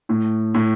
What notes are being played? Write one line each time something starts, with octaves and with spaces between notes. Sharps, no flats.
A2
A2